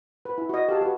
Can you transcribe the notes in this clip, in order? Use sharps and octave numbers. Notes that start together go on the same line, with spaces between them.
B4
E4
F#4 D#5
G4 G#4 F5 A5
F#4 B4